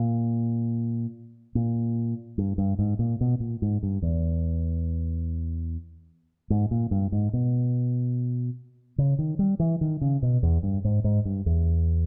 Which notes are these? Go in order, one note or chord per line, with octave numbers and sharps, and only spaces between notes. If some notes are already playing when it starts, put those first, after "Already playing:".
Already playing: A#2
A#2
G2
G2
G#2
A#2
B2
A#2
G#2
G2
E2
G#2
A#2
G2
G#2
B2
C#3
D#3
G3
E3
D#3
C#3
B2
E2
G2
G#2
G#2
G2
E2